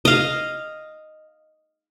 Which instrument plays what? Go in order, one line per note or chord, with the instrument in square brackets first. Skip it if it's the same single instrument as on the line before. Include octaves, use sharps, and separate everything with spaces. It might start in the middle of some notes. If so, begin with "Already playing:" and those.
[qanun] D#5 F5